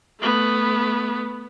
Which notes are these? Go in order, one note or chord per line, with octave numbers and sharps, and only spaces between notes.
A3 B3